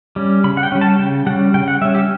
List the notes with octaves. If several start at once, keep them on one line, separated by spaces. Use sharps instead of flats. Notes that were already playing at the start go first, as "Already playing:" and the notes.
G3 C#4
C#3 B5
F#5
G5
G3 C#4
A5
C#3 G5
G3 C#4 F#5
C#3 G5
F#5
G3 C#4 E5
G4